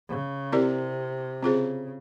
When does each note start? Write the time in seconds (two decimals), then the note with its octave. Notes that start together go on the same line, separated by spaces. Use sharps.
0.09 C#3
0.52 C3 C4 E4 G4 A#4 D5
1.42 C#3 C4 F4 G#4 C5